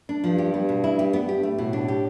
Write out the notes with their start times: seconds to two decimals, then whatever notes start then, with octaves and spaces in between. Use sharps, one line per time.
0.09 D4
0.16 G2
0.24 F3
0.38 G4
0.54 B3
0.69 B2
0.84 E4
0.99 G4
1.13 B3
1.28 G2 G4
1.43 A3
1.50 A2
1.58 B2
1.73 D4
1.88 G4